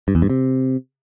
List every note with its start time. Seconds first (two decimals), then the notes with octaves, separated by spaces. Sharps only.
0.08 G2
0.15 E2
0.22 G2
0.30 C3